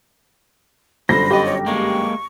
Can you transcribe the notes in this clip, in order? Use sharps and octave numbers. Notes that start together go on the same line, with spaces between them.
G1 F#2 D3 C5 B5 A#6
G4 C5 D#5
C#5
G#3 A#3 C#6